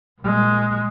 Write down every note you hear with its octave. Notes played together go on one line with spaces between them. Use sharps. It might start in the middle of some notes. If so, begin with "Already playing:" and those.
A#2 G#3